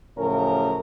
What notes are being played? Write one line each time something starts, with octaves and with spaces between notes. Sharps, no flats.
F#2 A2 C#3 F3 C#4 A#4